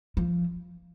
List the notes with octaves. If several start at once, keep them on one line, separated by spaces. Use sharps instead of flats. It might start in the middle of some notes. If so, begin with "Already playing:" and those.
F3